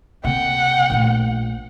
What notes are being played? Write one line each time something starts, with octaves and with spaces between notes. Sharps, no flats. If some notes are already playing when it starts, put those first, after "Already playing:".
C3 A#3 F#5 G5
A#1 A3